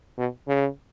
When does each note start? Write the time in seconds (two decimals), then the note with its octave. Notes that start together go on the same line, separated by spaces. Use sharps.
0.18 B2
0.48 C#3